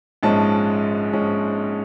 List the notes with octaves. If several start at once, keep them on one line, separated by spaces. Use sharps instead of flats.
A#1 G#2 F3 G#3 C#4 A5
F3 G#3 C#4